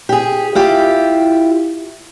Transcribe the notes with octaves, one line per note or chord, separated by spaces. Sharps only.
G4 G#4
E4 F4 G4